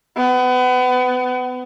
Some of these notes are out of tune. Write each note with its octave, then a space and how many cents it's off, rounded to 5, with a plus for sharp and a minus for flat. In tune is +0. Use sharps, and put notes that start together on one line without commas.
B3 +30